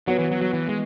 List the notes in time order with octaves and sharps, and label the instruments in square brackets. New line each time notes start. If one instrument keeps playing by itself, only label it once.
[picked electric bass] F#3 [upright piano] B3 F#4 C#5
[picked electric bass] E3
F#3
F#3
E3
G#3